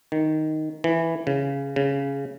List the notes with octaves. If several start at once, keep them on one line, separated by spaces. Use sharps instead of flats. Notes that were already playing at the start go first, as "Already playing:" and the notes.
D#3
E3
C#3
C#3